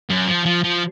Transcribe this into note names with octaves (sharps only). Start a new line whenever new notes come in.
F#2
F3
F3
F3